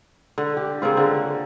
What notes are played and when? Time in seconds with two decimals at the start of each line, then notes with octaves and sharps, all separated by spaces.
0.38 D3
0.57 G4
0.82 C#3 A#3 C4 F4
0.97 D3